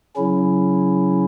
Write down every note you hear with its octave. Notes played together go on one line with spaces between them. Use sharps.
C#3 F#3 C#4 E4